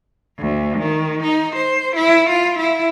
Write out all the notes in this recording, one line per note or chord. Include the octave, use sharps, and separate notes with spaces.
D2
D#3
D#4
C5
E4
F4
E4